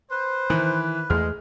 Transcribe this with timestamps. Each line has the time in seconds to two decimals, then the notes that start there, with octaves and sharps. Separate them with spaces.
0.11 B4 C5
0.50 D#3 E3
1.10 E2 G#3 A3 F6